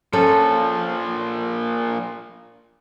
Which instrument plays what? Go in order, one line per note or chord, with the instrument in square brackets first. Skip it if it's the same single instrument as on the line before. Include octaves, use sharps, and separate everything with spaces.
[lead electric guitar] A#2 F3 [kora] C#4 A4